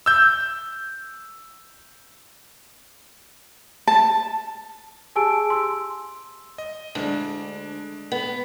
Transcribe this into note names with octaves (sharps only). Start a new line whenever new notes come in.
E6 G6
A5
G4 G#4 G#5 A5 E6 D7
C6 E6
D#5
D2 G#3 D4
B3